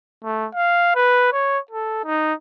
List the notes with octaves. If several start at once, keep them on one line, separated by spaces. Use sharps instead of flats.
A3
F5
B4
C#5
A4
D#4